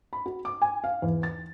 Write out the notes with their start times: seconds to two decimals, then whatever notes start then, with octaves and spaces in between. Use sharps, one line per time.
0.13 B5
0.26 F#4
0.45 D6
0.62 G#5
0.84 F5
1.02 E2
1.23 A6